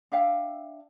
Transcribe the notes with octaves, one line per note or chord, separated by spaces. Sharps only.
D4 E5 F5 G5